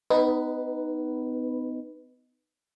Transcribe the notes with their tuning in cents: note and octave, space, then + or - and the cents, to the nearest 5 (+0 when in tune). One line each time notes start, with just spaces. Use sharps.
B3 +35 D#4 +0 B4 +0